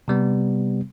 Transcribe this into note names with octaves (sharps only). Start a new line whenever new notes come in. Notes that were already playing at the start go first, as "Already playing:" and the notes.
C3 G3 B3